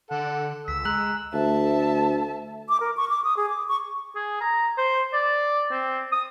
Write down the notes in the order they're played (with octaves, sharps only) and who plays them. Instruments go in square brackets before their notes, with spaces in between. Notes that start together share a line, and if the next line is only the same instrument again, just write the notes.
[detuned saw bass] D3 [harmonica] A4 F#5
[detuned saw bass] C#2 [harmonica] E6 [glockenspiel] B6
[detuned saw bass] G#3 [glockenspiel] A#5 F#6 F#7
[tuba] D2 [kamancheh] E5 A5
[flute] D6
A#4
C#6
D6
D#6
G#4
D6
C#6
[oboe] G#4
A#5
C5
D5
C4
D#6